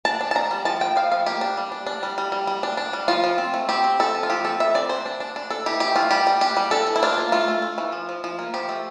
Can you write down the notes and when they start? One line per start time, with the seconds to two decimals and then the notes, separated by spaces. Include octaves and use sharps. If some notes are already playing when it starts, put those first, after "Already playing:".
0.05 D4 A5
0.21 D4
0.31 A5
0.35 D4 A#5
0.51 G3
0.65 F3 A5
0.81 F3 G5
0.96 F3 F5
1.12 F3 F5
1.26 A#3 G4
1.41 D4
1.57 G3
1.72 D4
1.86 D4
2.03 G3
2.18 G3
2.32 G3
2.47 G3
2.63 D4
2.77 D4
2.93 G3
3.08 F3 F4
3.24 F3
3.38 C4
3.54 A3
3.69 C4 G4
3.84 C4
4.00 C4 A4
4.15 F3
4.23 F4
4.30 F3 G4
4.44 C4 A4
4.60 F3 E5
4.74 C4 D5
4.89 D4 C5
5.06 D4
5.20 D4
5.36 D4
5.50 D4 A4
5.66 E3 G4
5.80 A3 G4
5.96 E3 F4
6.11 G3 G4
6.27 G3
6.41 D4 G4
6.57 G3
6.71 D4 A4
6.87 E3
6.96 E4
7.03 D4 F4
7.18 A#3
7.32 A3 F4
7.48 A3
7.62 A3
7.78 E3
7.92 F3
8.09 F3
8.24 F3
8.39 A#3
8.54 F3 G4
8.69 A3